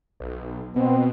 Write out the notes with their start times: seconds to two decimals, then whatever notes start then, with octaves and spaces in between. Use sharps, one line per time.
0.20 B1
0.76 B2 B3 C4